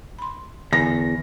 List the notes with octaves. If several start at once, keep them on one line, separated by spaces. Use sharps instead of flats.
B5 C6
E2 D3 G#5 A#6